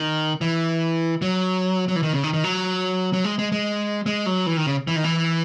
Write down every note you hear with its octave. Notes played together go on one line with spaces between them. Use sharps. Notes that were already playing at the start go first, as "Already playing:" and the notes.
Already playing: D#3
E3
F#3
F#3
E3
D#3
C#3
D#3
D#3
F#3
F#3
G#3
G#3
G#3
G#3
F#3
E3
D#3
C#3
E3
D#3
E3